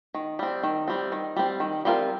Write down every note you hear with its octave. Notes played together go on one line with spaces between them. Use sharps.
D#3
G3 C4
D#3
G3 C4
D#3
G3 C4
D#3
G3 C4 F4 A#4